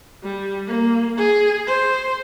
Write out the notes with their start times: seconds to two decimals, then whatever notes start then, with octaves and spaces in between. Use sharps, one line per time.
0.24 G3
0.68 A#3
1.17 G#4
1.67 C5